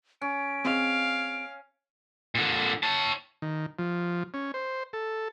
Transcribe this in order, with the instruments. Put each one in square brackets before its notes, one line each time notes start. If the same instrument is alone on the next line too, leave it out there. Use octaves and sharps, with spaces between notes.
[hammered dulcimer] C#4 [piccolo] D7
[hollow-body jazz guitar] C4 G#4 D#5 [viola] F5
[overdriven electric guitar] A#2 D3
C#5 A5
[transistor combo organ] D#3
F3
C#4
C5
A4